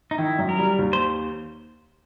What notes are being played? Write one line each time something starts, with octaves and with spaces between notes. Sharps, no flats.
D#4
D#3 E4
F#2
A#4
G3
D#2
C5